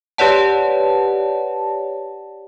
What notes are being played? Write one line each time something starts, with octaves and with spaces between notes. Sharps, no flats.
G4 B4 C#5 D5 F#5 A5